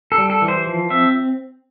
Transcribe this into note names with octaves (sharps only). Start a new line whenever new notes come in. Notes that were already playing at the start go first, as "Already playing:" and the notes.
A4
G3
A4
E3
C5
F3
C4 E5